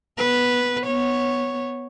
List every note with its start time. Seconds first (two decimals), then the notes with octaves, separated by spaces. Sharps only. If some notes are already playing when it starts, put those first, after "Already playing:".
0.17 B3 B4
0.86 B3 C#5